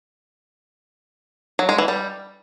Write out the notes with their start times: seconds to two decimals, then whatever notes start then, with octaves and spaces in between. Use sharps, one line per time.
1.59 F#3
1.69 G#3
1.78 E3
1.88 G3